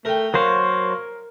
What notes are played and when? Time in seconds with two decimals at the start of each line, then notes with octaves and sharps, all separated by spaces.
0.05 A3 A#4 G5
0.34 F#3 A#3 A#4 C5 C#5